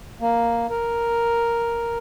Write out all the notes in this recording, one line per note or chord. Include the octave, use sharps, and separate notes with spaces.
A#3
A#4